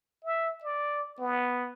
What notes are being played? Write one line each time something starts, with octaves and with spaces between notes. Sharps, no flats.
E5
D5
B3